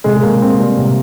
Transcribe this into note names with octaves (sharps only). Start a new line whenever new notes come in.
C3 G#3
G#3
C3 A#3
C3 C4
G3
C3